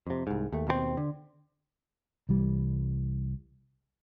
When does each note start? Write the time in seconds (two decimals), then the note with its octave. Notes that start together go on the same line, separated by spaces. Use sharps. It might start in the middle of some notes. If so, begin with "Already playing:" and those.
0.07 F2 C3
0.27 C2 G#2
0.52 D#2 A3
0.67 D#2 B2 G3 C4
0.97 D3
2.29 C2 E3 G3